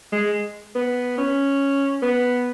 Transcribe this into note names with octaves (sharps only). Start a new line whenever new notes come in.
G#3
B3
C#4
B3